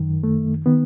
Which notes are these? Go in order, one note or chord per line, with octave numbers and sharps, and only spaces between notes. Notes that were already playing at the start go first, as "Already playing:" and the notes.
Already playing: F#2 D#3
A3
D#3 B3